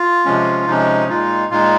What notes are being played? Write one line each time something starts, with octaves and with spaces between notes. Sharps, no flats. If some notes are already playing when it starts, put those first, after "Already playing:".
Already playing: F4
C3 F3 G#3 C#4
C3 F3 G#3 C#4 D#4
A#2 G#3 D#4 F4
A#2 G#3 D#4 F4